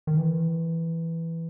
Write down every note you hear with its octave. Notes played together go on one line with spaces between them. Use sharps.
D#3
E3